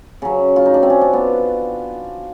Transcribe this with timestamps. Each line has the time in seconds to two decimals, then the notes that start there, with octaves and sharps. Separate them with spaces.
0.22 C#3 F#3
0.56 F4
0.66 D#4
0.74 D4
0.83 C4
0.90 C#4
1.01 D4
1.13 B3